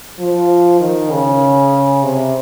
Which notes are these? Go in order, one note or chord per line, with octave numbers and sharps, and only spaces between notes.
F3
D#3
C#3
C3